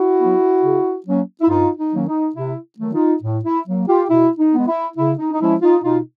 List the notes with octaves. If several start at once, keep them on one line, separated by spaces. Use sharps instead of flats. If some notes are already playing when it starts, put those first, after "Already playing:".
Already playing: E4 F#4
F#3 B3
C#3
F#3 A#3 C#4
E4
G2 D#4 F4
D#4
D#3 F#3 A#3 C#4
D#4
C3 E4
D#3 F#3 A3
D#4 F4
A2
E4
F#3 A#3
F4 G4
B2 E4
D#4
G#3 B3
E4
C#3 E4
D#4
D#4
F3 G#3 C#4 E4
D#4 F4
B2 D#4 F4